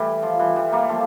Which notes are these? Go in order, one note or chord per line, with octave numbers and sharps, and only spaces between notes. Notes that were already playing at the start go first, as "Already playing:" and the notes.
Already playing: E3 G3 A3
F3
E3 G3
E3 G3
G3 A#3
F3 A3